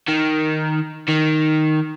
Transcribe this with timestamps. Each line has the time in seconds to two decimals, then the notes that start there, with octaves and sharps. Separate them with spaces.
0.08 D#3
1.09 D#3